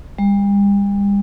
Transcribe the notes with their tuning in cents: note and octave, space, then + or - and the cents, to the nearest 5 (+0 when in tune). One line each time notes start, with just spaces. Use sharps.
G3 +40